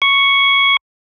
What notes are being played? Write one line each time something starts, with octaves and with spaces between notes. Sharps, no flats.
C#6